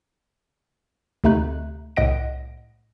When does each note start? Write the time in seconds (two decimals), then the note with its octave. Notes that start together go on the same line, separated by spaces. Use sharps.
1.24 D2 C3 A3 D#4 F#6
1.96 C2 A2 D#5 F#5 A#6 D7